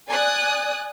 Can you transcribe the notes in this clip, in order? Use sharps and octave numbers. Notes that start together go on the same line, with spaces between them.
D5 G#5 D#6 F#6